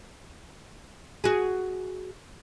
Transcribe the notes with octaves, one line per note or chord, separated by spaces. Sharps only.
F#4 G#4